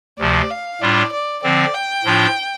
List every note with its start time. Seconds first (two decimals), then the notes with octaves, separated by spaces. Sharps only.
0.19 D2 C3 F3 D5
0.50 F5
0.81 A2 G3 D4 F4 D5
1.12 D5
1.43 D3 F3 C4 D5
1.74 G5
2.05 A2 F3 D4 F4